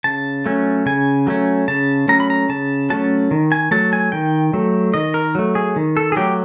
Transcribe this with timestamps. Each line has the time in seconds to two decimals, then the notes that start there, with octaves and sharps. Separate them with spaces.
0.04 C#3 A5
0.46 F#3 A3 C#4
0.86 C#3 G#5
1.27 F#3 A3 C#4
1.68 C#3 A5
2.08 F#3 A3 C#4 A#5
2.20 B5
2.30 A#5
2.49 C#3 A5
2.90 F#3 A3 C#4 A5
3.31 D#3
3.52 G#5
3.71 F#3 A3 A5
3.93 G#5
4.12 D#3 G5
4.53 F#3 A3
4.94 D#3 D#5
5.14 A#4
5.35 F#3 A3
5.55 G#4
5.76 D#3
5.97 A4
6.12 G#4
6.16 F#3 A3 G4